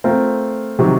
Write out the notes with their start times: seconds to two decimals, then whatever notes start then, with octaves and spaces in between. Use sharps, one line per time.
0.04 A3 C4 F4 A#4
0.79 C3 D#3 F#3